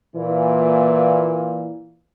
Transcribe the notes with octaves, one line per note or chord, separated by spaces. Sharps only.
A#2 E3